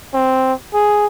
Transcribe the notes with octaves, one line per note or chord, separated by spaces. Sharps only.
C4
G#4